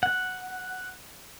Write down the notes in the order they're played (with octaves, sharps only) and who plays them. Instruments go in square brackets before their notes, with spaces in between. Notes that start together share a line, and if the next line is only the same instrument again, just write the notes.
[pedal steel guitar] F#5